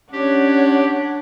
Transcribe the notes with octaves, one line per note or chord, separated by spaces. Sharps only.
C#4 D4 G4 C#5 F#5